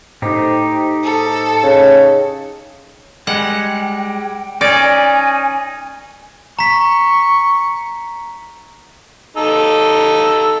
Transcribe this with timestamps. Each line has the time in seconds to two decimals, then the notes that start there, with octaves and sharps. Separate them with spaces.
0.22 A2 D#4 G4 C5
1.04 A4
1.63 C#3
3.27 G3 G#3 F#5 G5
4.61 C#4 D#4 D5 G#5
6.59 A#5 C#6 B6
9.37 D#4 A4 E6